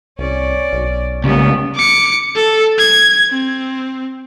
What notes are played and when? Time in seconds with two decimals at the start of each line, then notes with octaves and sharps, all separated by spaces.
0.19 C2 C#4 D5
0.73 B1
1.24 C#2 G3 A#3 B3 C#4
1.76 D6 C#7
2.36 A4
2.78 G#6
3.30 C4